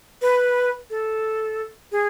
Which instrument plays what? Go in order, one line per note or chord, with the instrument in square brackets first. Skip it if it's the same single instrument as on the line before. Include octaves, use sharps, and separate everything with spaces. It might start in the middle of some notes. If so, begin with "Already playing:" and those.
[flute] B4
A4
G#4